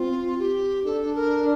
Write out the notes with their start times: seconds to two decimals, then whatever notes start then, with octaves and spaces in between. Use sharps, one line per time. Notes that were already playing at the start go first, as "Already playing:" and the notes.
Already playing: C4 F4
0.39 G4
0.85 D4 A4
1.15 A#4